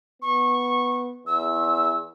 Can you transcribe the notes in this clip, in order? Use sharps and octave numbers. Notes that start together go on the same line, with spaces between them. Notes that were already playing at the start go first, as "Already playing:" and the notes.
B3 C#6
E2 E6